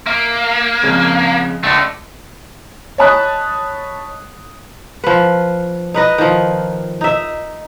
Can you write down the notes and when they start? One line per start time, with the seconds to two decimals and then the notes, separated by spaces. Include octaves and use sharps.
0.06 A#3 E5
0.83 F2 C#3 G#3
1.63 C#2 D3 A3 D5 A#6
2.98 C#5 D#5 A5 B5 D#6 F#6
5.04 F3 B4
5.94 D#4 B4 D#5
6.18 D#3 F3
7.01 D#4 E5